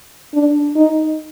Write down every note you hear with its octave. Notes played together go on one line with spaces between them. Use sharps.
D4
D#4